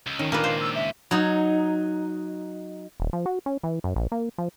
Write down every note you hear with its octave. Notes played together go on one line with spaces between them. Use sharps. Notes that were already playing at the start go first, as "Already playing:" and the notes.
C#2
D#3 C#4
A#2 A#3 D4 A#4 B4
C5 F5
E6
E5
F#3 D#4
D#1
F3
F#4
C#4
E3
F#2
A#1
A#3
F3